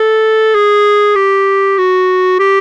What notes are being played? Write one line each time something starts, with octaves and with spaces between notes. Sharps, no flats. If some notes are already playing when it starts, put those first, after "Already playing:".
Already playing: A4
G#4
G4
F#4
G4